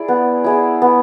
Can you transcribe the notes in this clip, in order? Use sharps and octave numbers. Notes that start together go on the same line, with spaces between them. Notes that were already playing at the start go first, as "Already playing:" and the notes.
Already playing: E4 G#4 D5
B3
E4 G#4 D5
B3